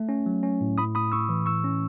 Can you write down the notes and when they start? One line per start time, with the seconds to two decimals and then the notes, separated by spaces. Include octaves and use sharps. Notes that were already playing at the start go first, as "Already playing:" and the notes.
Already playing: A3
0.09 C#4
0.26 F#3
0.43 C#4
0.61 A2
0.78 A2 B5 D#6
0.95 A2 B5 D#6
1.12 A2 C#6 E6
1.29 E3
1.46 A2 C#6 E6
1.64 C#4